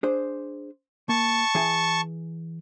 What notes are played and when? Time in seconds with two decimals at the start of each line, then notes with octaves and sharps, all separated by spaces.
0.03 D4 G#4 C5
1.09 A#3 A5 C#6
1.55 E3 G#4 G#5